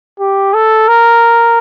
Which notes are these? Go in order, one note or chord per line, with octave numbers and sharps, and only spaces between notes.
G4
A4
A#4